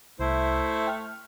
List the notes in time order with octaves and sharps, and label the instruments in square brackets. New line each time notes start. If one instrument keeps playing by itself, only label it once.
[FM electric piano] C2 [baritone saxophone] A3 [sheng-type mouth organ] E4 C5
[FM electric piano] G5 F6